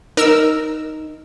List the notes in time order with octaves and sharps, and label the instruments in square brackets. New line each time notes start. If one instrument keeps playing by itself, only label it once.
[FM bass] D#4 [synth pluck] A#4 E6